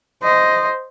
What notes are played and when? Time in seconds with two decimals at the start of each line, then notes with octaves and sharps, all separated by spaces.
0.23 C5 D#5